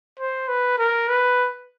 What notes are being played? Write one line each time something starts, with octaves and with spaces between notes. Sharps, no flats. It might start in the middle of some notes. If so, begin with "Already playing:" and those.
C5
B4
A#4
B4